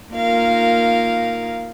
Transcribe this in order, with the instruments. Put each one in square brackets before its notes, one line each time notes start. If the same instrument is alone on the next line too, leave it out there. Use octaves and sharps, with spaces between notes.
[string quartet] A#3 D#4 F4 A#4 F5